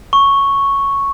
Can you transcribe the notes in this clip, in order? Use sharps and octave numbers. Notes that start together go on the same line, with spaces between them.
C#6